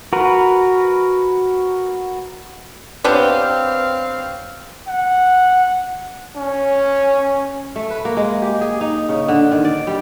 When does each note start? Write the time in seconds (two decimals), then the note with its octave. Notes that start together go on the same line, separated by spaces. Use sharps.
0.13 F#4 A#4 B4
3.04 B3 C4 D4 G4 B4 C#5 F5
4.88 F#5
6.37 C#4
7.76 A3
7.90 B4
8.05 A#3
8.17 G#3
8.42 G4
8.61 G#4
8.81 D#4
9.09 C#3
9.28 D3
9.52 D#3
9.65 D5
9.87 G3